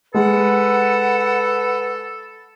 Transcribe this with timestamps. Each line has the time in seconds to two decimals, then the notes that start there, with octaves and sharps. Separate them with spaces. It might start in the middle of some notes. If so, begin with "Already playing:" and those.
0.14 G#3 A4 B4 F#5